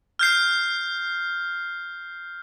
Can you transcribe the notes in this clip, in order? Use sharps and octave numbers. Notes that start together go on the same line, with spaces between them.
F6 G6 C7